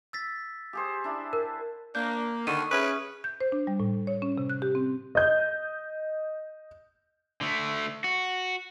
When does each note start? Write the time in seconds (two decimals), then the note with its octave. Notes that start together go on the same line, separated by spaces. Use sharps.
0.13 E6 A6 B6
0.73 G4 G#4 C5
1.04 D4 E4
1.33 A#4
1.95 A#3 D4 G6
2.47 D3 D#3 C#6 D#7
2.72 C#4 G#4 B4 E5 D#6
3.24 G6
3.41 C5
3.52 D4
3.67 G3
3.80 A2
4.07 C#5
4.22 C#4
4.38 C3
4.50 F#6
4.62 G4
4.75 C4
5.15 D#5 G6
7.41 D3 A3
8.04 F#4